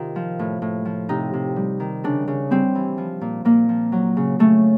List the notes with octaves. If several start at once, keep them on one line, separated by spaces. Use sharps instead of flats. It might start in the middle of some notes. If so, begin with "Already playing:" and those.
Already playing: C3 D#3 F4
F3
A2
A2
F3
C3 D#4
C3
G3
D#3
C#3 D4
C#3
G3 C4
E3
F3
A#2
A#2 A#3
F3
F#3
C#3
C#3 A3